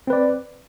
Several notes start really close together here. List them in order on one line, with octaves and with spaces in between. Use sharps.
C4 B4 D5